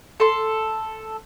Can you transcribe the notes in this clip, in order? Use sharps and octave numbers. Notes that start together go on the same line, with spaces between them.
A4 C6